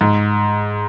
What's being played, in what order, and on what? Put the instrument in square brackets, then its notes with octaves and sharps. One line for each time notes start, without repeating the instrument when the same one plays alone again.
[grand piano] G#2